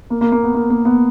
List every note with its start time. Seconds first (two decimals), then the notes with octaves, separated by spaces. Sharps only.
0.10 A#3
0.21 A#3
0.32 A#3
0.43 B3
0.55 A#3
0.70 A#3
0.85 B3